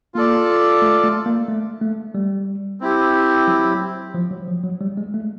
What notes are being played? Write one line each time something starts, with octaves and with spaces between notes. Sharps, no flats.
A#3 F4 A4 D5
A3
A3
A#3
A3
A3
G3
C4 E4 G4
F#3
F3
F#3
F3
F#3
G3
G#3
A3